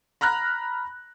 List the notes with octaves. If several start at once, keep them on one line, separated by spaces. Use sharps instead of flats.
A#5 B5 F6 F#6 A#6